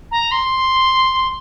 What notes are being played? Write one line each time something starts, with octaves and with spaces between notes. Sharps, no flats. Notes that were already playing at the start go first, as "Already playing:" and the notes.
A#5
C6